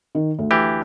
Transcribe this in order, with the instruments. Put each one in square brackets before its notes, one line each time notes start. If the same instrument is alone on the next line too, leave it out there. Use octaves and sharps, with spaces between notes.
[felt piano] D#3
D2
[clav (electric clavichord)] E3 G4